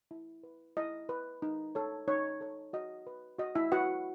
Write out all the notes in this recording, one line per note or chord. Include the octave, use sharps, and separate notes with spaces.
E4
B4
E4 D#5
B4
D#4
A4 C#5
D#4 C#5
A4 C#5
F#4 D#5
B4
F#4 D#5
E4 E5
F#4 B4 F#5